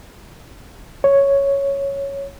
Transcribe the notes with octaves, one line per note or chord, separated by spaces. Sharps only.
C#5